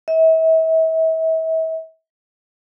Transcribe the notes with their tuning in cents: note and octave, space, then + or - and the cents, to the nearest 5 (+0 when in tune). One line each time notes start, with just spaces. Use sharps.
E5 -40